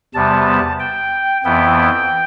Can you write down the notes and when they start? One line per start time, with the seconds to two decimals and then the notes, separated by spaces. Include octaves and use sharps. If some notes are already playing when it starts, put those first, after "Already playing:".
0.14 E2 C3 G3 B3 A5
0.80 G5
1.44 F2 E3 B3 E4 G5